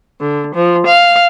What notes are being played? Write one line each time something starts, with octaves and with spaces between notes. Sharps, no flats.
D3
F3
F5